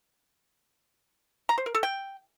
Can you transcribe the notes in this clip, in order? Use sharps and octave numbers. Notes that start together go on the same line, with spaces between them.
A#5
C5
A#4
A4
G5